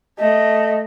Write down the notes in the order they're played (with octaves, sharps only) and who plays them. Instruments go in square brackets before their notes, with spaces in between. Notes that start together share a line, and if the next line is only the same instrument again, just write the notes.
[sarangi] A3 [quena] D#5